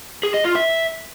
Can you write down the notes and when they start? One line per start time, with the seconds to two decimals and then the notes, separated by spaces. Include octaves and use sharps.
0.23 G#4
0.34 D#5
0.45 F4
0.56 E5